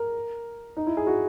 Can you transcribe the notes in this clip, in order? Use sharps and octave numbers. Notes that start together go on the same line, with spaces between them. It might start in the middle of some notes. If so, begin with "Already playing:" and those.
Already playing: A#4
D#4
E4
G#4
F#4